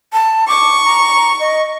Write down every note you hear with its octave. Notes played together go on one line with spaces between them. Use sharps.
A5
C#6 D6
A#5
D#5